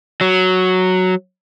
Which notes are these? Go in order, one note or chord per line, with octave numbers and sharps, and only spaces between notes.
F#3